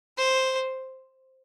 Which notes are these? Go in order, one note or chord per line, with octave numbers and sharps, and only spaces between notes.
C5